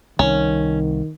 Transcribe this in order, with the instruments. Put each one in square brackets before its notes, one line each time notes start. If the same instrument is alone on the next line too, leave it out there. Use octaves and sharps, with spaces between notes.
[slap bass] C2 C3 [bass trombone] D#3 [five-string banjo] C#4